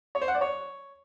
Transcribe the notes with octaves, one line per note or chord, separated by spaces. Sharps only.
C#5
C5
F#5
D5
C#5